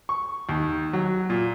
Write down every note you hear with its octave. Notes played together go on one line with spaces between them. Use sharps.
C#6
D#2
F#3
A#2